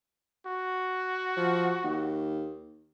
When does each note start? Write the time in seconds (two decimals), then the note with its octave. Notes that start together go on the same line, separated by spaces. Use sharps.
0.46 F#4
1.37 F3
1.84 D#2